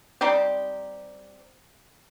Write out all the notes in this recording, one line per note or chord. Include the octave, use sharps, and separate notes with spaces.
G3 C4 D#4 G4